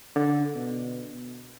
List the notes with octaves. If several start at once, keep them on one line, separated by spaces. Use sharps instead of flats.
D3
B2